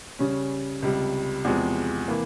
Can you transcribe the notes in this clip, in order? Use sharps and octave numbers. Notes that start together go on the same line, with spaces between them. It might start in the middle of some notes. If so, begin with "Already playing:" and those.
C#3 G3 C#4
C#2 C3 G3
E2 C3 F3 G#3
C3 E3 A#3